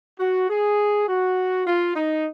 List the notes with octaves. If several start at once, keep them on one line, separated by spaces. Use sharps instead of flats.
F#4
G#4
F#4
F4
D#4